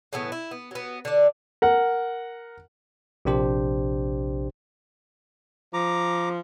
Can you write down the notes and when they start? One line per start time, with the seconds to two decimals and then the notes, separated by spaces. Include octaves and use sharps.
0.13 A2 C#3 E3 B3
0.32 E4
0.51 B3
0.71 F#3 B3
1.05 D3 D5
1.62 A#4 F#5
3.25 A#1 C3 D4 G4 C5
5.74 F3 A#5 D6